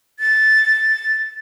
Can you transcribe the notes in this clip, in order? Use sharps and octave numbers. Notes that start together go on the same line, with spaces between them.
A6